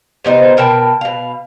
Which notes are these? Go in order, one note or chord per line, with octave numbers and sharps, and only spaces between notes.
C3 B3 D#4 C5
B2 A#4 G5 A5
B2 F5